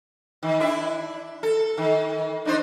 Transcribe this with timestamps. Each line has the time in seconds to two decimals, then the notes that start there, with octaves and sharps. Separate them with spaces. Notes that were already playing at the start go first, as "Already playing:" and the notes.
0.43 D#3
0.59 D4 E4 E5
1.43 A4
1.77 D#3
2.45 D4 D#4 C5